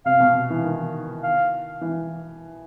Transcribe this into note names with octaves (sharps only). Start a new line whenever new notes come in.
C3 F5
B2
E3
D#3
F5
E3